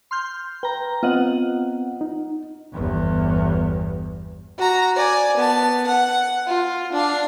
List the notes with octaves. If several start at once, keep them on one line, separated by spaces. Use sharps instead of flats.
C6 F6 G6
B4 G5 A#5
B3 C4 F4 D#5 F#5
D#4
G1 E2
F#4 A#5
D5 G#5
B3 A5
F#5
F4
D4 F5